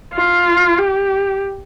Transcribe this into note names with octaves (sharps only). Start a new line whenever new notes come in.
F4
G4